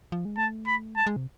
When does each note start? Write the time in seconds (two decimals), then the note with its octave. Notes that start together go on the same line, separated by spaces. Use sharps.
0.12 F3
0.25 G#3
0.37 A3 A5
0.67 B5
0.96 G#3 A5
1.07 G#3
1.16 C3